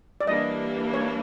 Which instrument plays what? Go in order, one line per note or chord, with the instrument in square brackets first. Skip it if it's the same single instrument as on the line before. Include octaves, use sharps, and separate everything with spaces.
[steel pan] D5
[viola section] E3 G3 A#3 D4 [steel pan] D#5
[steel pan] C#5